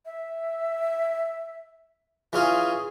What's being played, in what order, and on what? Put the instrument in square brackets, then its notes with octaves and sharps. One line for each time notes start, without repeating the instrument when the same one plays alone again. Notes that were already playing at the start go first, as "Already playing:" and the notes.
[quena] E5
[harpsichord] E3 C#4 F4 [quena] G#4